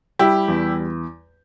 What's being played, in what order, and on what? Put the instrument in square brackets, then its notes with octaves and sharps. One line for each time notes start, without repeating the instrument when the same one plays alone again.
[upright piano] G3 [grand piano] E4 G4
[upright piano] E2